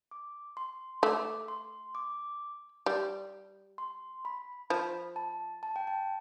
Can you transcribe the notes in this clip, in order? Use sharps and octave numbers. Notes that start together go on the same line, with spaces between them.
D6
C6
A3 D6
C6
D6
G3
C6
B5
F3 B5
A5
A5
G5
A5